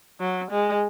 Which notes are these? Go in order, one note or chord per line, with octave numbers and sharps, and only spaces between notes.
F#3
G#3